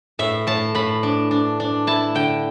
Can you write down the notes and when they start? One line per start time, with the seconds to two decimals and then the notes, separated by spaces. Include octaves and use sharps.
0.19 A2 E5
0.47 A2 A5
0.75 A2 B5
1.03 D4
1.31 D4
1.60 D4
1.87 E4 A5
2.15 D3 G5